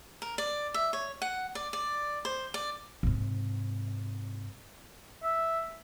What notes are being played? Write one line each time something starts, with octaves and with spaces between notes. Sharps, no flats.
A#4
D5
E5
C#5
F#5
D5
D5
C5
D5
G#2 C3
E5